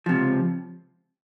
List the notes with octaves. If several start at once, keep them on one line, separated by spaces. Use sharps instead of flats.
C#2 C3 F3